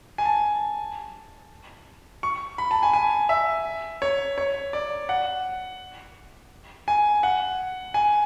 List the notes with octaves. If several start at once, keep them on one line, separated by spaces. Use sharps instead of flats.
G#5
A5
C#6
B5
A5
G#5
G#5
E5
C#5
C#5
D5
F#5
G#5
F#5
G#5